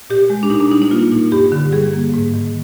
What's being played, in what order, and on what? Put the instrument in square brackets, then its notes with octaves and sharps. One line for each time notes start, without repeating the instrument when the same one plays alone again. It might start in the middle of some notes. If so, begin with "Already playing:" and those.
[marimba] A#2 G4
G#3
D4
A#2 D#4
D4
G3 D#4
D#4
A#3 F4
A#2
G2 G4
D3
G3 G#4
A#3
G#2
D#3